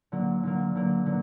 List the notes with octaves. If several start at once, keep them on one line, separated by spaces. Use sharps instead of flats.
D3 F#3 A#3
D3 F#3 A#3
D3 F#3 A#3
D3 F#3 A#3